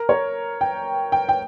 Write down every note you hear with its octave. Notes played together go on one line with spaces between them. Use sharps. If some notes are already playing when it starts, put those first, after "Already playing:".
Already playing: A#4
C#5
G5
G5
G5